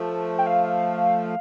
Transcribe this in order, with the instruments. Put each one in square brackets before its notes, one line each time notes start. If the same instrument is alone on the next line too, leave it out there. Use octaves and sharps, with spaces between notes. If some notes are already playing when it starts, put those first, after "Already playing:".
Already playing: [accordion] F3 A3
[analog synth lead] G5
F5